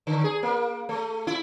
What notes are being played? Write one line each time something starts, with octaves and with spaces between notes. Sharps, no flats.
D3
G#4
A#3
A3
E4